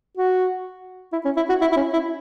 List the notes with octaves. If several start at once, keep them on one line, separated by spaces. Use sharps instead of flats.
F#4
E4
C#4
E4
F#4
E4
E4
C#4
E4